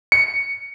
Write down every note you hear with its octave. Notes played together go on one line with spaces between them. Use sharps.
C#7